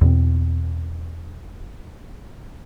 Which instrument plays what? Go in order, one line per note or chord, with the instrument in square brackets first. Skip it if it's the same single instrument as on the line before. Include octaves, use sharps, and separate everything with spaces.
[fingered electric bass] E2 B2 C4